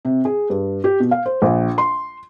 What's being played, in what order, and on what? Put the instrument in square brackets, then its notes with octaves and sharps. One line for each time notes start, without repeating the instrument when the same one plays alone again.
[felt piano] C3
G#4
G2
G4
B2
F5
C5
A#1
C6